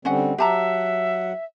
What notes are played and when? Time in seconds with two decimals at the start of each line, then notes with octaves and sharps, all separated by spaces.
0.05 D3 G3 C4 C#4 D#5 F#5
0.38 F#3 G4 E5 F#5 A5 A#5